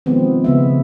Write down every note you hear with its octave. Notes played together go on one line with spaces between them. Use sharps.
D#3 F3 G#3 B3 C4
C#3 B3 E5